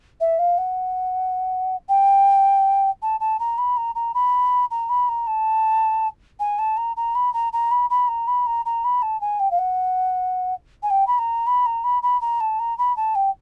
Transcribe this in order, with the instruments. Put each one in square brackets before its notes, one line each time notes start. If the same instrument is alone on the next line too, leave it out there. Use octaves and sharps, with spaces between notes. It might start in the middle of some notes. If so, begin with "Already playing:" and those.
[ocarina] E5
F5
F#5
G5
A5
A5
A#5
B5
A#5
A#5
B5
A#5
B5
A#5
A5
G#5
A5
A#5
A#5
B5
A#5
A#5
B5
B5
A#5
B5
A#5
A#5
B5
A5
G#5
G5
F5
F#5
G#5
G5
B5
A#5
B5
A#5
B5
B5
A#5
A5
A#5
B5
A5
G5